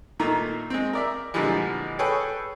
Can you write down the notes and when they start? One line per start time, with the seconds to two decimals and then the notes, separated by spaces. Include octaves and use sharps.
0.20 A#2 D#3 A3 A#3 A#5
0.70 G#3 C4
0.93 A#4 D5 E5
1.34 A#2 D3 E3 F3 G3 G#3
1.99 G#4 A4 B4 C#5 G5